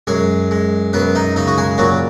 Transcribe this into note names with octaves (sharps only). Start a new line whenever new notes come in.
F#2 G#3 G#4
G#3
F#2 B3 B4
D#4 D#5
C#3 D#4 D#5
F#4
G#3 G#4
A#2 F#3 F#4